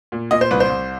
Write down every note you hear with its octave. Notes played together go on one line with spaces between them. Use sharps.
A#2
A#2 D#5
C5
C2 B4
C5
C2